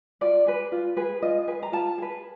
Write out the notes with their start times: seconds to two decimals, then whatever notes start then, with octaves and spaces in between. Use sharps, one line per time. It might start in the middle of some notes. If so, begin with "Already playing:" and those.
0.21 F4 D5
0.46 G#4 B4
0.72 F4
0.97 G#4 B4
1.22 F4 D#5
1.48 G#4 B4
1.63 A#5
1.72 F4 A5
1.98 G#4 B4